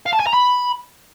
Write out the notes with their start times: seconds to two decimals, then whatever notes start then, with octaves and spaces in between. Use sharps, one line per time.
0.06 F5
0.13 A5
0.20 G#5
0.27 A#5
0.33 B5